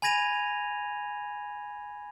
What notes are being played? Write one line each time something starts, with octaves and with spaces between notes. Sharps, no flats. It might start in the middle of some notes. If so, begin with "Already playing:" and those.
G#5 B5 G#6 A#6 D#7 F7